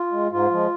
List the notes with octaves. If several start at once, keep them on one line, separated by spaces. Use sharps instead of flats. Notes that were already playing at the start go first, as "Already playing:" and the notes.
Already playing: F4
G#3
G#2 F4
F3 G#3